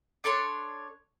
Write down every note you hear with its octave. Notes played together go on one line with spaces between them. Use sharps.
D4 A4 C#5 C6